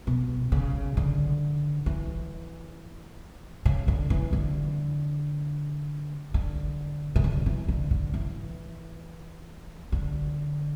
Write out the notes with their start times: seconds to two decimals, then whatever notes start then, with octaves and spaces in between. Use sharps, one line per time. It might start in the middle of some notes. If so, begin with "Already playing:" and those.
0.07 B2
0.52 C#3
0.97 D3
1.86 E3
3.65 C#3
3.88 D3
4.10 E3
4.33 D3
6.34 D3
7.16 C#3
7.24 D3
7.46 E3
7.68 D3
7.91 D3
8.14 E3
9.92 D3